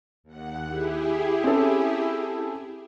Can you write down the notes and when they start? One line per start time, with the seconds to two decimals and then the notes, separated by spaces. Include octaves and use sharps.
0.24 D#2 F#5
0.68 E4 G4 G#4
1.44 C4 C#4 A4